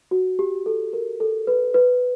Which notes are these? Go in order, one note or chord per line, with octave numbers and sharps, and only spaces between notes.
F#4
G4
A4
A#4
A4
B4
B4